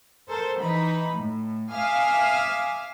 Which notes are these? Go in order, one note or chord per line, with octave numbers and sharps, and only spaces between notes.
A4 A#4 C5
E3 D#4 B5
A2
E5 F5 G#5 D6 D#6 F6